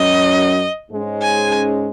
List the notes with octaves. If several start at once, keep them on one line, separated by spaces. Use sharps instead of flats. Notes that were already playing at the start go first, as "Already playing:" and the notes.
Already playing: F#2 F#3 C#4 D#5
G#2 G#3 C#4
G#5